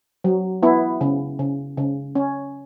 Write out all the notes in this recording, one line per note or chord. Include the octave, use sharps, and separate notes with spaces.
F#3
B3 E4
C#3
C#3
C#3
C#4